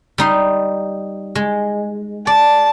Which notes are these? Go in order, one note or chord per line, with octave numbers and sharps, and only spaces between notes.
G3 D#4 C6
G#3
D5 A5